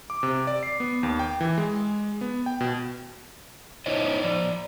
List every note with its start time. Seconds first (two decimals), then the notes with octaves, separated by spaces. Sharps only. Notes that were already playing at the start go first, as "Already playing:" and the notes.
0.10 D6
0.23 C3
0.47 D5
0.63 C7
0.80 B3
1.03 D#2
1.19 G5
1.41 E3
1.58 G#3
2.21 B3
2.46 G5
2.61 B2
3.86 D#4 E4 C5 C#5 D#5
4.23 F3 D5